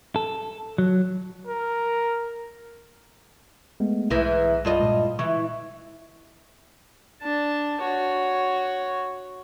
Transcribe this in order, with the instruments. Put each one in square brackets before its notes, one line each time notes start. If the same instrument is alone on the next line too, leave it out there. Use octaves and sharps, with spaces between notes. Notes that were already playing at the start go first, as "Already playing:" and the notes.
[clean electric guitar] A4
F#3
[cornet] A#4
[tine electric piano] G#3 A3 B3
[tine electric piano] B1 A#6 [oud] G#2 E3
[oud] G2 F4 D#5
[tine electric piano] A#2 G#3
[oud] E3 [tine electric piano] C#6
[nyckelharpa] D4 A5
F#4 C#5